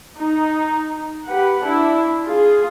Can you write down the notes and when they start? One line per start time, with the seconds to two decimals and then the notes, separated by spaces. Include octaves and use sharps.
0.18 D#4
1.26 G4 B4 F#5
1.64 D4 E4
2.25 F4 G#4